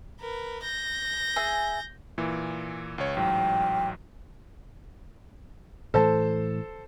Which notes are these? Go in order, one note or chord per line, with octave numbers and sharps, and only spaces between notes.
A#4 B4
G6 A#6
G#4 E5 G#5
A#2 E3
C#2 C#5
A1 G#2 F#3 G5
A2 E3 A3 A4 C5 A5